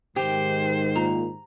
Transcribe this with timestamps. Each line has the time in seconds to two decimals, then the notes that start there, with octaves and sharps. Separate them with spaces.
0.16 G#2 D#3 G4 C5
0.96 A#2 A#5